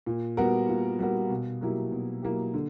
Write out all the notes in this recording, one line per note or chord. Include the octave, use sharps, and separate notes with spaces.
A#2
G3 B3 F#4 A#4
A#2
G3 B3 F#4 A#4
B2
F#3 A#3 E4 G4
B2
F#3 A#3 E4 G4
D3